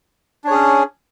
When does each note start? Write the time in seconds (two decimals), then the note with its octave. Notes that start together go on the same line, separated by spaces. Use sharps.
0.44 D4
0.47 C#5
0.51 G#4
0.54 C#4